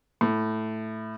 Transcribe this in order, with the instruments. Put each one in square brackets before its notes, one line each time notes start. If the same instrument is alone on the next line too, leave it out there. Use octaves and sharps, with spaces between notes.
[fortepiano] A2